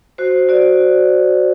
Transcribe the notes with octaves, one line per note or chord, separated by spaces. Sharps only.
F#4 C5
F#4 D5